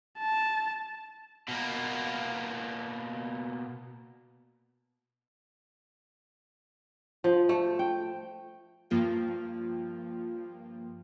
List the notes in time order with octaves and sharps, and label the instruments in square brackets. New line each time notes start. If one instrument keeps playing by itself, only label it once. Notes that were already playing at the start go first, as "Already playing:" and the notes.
[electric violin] A5
[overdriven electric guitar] B2 A#3
[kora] F3
A3
G5
[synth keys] G2 F3 A#3 F4 G5